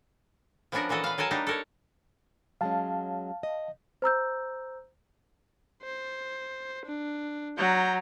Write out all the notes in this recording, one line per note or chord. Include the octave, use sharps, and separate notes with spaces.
F3 B3 C#4 D4 F#4 A#4
A#2 E3 F#4 A4 D#5
B4 F5
F#3 A4 A#4 G#5 A5
G3 A#3 D4 D#4 G4
A4 A#4 C#5
F#3 G#3 C#4 F5 A5
D#5
C5 A#5 E6 G6
C5
D4
F#3 A#5 G6